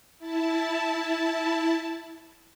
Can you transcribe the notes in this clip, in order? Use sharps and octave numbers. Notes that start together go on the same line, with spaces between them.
E4 A5